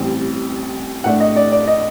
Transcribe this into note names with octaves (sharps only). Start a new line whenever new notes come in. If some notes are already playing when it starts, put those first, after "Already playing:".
Already playing: A1 A2 G3 C4
A2 A3 D4 F#5
D#5
D5
D5
D#5